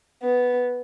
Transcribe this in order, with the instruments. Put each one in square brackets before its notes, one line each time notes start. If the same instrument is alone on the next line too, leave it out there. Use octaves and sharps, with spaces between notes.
[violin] B3